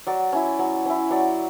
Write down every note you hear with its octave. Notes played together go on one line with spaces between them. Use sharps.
F#3 D5
C#4 E4
F#3
C#4 E4
F#3 D5